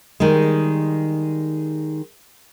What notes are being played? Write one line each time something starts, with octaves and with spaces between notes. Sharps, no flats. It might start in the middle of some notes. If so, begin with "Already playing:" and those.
D#3 G3 G#3